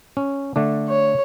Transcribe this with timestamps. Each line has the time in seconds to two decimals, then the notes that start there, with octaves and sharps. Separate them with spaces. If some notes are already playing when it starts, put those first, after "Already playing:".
0.17 C#4
0.56 D3 A3 D4
0.88 C#5